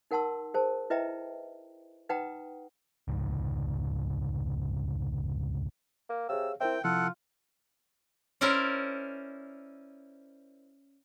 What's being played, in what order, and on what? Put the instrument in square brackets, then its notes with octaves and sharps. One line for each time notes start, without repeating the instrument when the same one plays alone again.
[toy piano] D#4 A#4 F#5 A5 C6 E6
G#4 A#4 C5 A5
E4 B4 D#5 E5 G5 A#5
D#4 B4 F#5 G5 A#5 D#6
[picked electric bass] F1 C#2 G#2
[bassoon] A#3
[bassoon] C3 [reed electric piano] G#4 C#5 F5 [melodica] E6
[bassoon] C4 [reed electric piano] E4 A#4 E5 [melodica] G5
[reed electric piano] C3 F3 E4 [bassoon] F4 [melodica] A4 F#5
[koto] C#4 E4 A#4 C5 D5